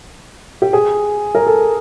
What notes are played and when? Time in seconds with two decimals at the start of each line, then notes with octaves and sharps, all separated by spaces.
0.62 G4
0.73 G#4
1.35 A#4
1.46 A4